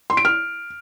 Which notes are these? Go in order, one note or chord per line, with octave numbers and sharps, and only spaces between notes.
C6
D7
F6